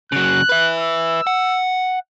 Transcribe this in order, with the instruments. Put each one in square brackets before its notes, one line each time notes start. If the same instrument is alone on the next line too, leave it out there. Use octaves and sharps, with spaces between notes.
[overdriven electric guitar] C#3 F#3 [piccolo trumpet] F#6
[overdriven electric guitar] B4 E5
[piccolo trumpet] E6
[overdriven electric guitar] F#5